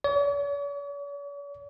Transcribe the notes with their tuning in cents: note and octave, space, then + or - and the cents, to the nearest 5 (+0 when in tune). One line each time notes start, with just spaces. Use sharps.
C#5 +45